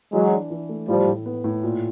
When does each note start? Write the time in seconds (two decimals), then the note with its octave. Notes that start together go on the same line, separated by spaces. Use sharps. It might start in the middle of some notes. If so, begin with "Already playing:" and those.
0.12 E3 F#3 G#3
0.32 D4
0.50 E3
0.69 A3
0.88 A2 F3 G3
1.07 A2
1.26 B3
1.44 A2
1.63 A#2